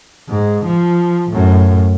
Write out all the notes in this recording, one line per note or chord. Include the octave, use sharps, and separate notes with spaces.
G#2
F3
F#2 A2